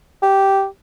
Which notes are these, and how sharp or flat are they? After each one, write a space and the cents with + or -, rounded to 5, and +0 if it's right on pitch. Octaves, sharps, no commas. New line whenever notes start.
G4 -10